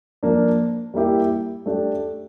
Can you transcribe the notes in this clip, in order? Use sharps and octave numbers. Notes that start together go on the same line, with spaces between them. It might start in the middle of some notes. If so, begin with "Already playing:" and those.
F3 A#3 D4
G3 A#3 E4 G4
A3 D4 G4